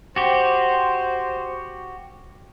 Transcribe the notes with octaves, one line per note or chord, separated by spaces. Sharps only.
F#4 G4 C5